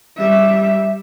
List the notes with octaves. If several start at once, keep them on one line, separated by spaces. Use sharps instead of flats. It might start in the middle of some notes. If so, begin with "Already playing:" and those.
G3 E5